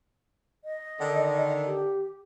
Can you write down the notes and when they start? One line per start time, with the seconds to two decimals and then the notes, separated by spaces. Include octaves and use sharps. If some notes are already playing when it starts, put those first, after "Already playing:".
0.65 D#5
1.00 D3 D#3
1.67 G4